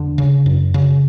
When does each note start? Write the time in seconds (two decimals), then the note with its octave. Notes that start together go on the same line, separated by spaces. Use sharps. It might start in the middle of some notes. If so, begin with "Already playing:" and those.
Already playing: E2 D3
0.18 C#3
0.46 F#2
0.74 C#3